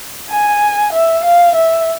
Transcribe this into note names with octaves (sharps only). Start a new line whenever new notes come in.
G#5
E5
F5
E5